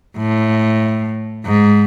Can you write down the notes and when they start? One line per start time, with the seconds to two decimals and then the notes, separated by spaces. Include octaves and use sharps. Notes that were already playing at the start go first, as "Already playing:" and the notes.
0.17 A2
1.45 G#2